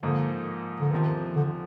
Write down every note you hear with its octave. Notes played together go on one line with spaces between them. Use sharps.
G#2 D3 F3 A#3 D#4
D3
E2 C3 D#3 F3
D3